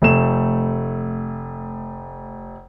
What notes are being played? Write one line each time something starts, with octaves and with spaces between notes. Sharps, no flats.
F1 A3 E7